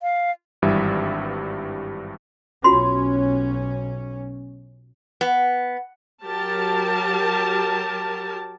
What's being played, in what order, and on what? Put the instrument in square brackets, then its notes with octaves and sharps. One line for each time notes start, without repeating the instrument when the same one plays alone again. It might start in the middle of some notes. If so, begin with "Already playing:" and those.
[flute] F5
[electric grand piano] G#1 G2 E3 G3 E5
[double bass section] B1 C#4 [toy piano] F4 F#4 C6
[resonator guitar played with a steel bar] B3
[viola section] F#3 G4 A#4 A5